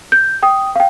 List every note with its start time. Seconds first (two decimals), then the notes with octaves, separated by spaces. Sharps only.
0.12 G6
0.43 G5 D#6
0.76 F5 G5